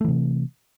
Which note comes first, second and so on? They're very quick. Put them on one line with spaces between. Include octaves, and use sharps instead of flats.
A3 E3 C3